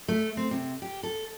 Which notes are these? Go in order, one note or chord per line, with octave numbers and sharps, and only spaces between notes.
A3
C4
C3
G4
A4